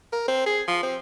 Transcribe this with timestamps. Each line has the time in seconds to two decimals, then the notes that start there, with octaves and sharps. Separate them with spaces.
0.12 A#4
0.28 C4
0.46 G#4
0.68 F3
0.83 C4